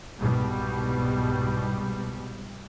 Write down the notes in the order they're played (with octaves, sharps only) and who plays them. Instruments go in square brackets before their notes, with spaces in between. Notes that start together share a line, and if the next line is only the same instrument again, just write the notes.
[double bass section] C2 G#2 B2 G3